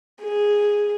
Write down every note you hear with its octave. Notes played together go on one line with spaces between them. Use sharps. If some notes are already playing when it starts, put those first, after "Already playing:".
G#4